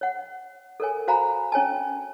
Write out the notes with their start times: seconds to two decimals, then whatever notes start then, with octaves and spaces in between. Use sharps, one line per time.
0.01 C#5 F#5
0.80 A4 A#4 C#5 G#5
1.07 F#4 C5 F5 G#5 A#5 B5
1.52 C#4 C#5 G#5 A5